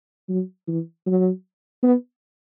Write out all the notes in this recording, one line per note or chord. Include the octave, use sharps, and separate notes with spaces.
F#3
E3
F#3
B3